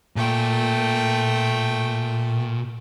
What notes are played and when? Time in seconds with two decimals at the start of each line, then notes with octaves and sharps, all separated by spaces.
0.16 A#2 A3 G5